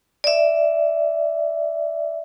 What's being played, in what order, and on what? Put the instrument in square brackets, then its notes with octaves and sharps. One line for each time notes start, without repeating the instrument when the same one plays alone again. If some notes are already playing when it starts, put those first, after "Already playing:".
[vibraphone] D5 E5